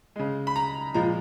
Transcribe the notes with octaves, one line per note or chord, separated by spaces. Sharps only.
C#3 G#3
B5
A#5
A#2 F3 G#3 A#5